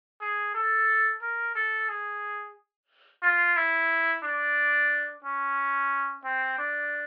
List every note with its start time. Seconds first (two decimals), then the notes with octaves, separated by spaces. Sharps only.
0.21 G#4
0.55 A4
1.22 A#4
1.55 A4
1.89 G#4
3.23 F4
3.56 E4
4.23 D4
5.24 C#4
6.25 C4
6.59 D4